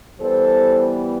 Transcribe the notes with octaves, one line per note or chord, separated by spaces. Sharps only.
E3 G3 B3 A4 C5